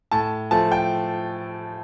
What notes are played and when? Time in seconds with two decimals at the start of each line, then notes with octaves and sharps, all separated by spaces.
0.11 A2 A5
0.51 F3 A3 A5
0.72 G5